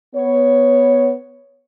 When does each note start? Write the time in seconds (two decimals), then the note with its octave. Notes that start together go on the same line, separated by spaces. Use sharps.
0.15 B3 C#5